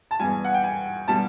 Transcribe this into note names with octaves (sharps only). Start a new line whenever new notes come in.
A5
E2 B2 G3 G#5
F#5
G5
G#5
B2 G3 A5